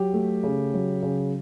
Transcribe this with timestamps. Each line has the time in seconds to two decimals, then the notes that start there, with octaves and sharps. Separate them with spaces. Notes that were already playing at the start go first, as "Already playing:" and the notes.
Already playing: F#3 G4
0.13 A3
0.43 C#3
0.74 F#3
1.03 C#3